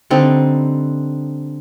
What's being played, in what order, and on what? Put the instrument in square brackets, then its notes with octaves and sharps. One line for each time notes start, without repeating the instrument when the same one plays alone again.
[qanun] D3 G3 C4 D#4